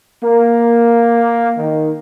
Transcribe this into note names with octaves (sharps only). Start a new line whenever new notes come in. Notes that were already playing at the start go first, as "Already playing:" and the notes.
A#3
D#3